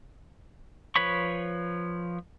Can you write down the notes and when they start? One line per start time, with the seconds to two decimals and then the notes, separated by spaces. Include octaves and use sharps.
0.96 F3 B4 C#5 B5 C#6